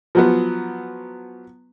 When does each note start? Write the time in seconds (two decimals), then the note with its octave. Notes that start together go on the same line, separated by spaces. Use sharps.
0.15 F3 F#3 B3